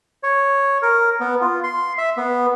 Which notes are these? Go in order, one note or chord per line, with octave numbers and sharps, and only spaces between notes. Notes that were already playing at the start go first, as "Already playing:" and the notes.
C#5
A#4
B3
F4
C6
E5
B3